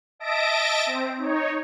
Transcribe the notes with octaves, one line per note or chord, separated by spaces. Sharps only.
D#5 E5 A5 A#6 D7
C4
D#4 C#5